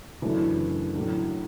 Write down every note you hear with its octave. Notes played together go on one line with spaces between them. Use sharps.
F#2 C#3 E3 A3 D4
A2 F#3 A3 D4